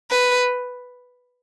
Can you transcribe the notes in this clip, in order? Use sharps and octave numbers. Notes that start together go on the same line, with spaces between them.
B4